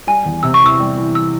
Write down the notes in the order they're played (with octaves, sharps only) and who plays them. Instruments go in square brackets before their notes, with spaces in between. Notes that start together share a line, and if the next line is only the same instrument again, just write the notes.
[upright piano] G3 [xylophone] G#5
[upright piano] E2
[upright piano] C3 [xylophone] E6
[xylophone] C#6
[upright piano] E3 [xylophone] E6
[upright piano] G3
E3
[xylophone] E6